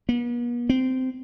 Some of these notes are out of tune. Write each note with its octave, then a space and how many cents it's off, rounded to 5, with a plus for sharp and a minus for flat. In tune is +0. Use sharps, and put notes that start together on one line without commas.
B3 -45
C4 -15